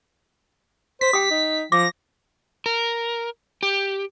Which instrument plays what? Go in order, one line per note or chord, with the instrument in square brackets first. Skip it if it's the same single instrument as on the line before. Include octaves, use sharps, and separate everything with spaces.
[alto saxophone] C5 [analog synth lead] B6
[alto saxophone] G4 [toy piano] G5 D#6
[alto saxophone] D#4
[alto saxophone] F3 [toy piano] D6 [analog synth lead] A#6
[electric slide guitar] A#4
G4